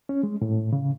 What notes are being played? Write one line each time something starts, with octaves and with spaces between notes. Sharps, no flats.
C#4
G#3
A2
C#3